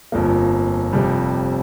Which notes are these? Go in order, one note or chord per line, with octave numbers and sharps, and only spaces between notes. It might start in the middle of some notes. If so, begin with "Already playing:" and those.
G1 F2 F3 A#3
F1 F2 C3 G3